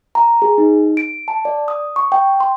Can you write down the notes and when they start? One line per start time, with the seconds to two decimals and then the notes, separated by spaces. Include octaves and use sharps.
0.15 A#5
0.42 G#4
0.58 D#4
0.97 D7
1.28 A5
1.45 D5
1.68 D#6
1.96 C#6
2.12 G5
2.40 C6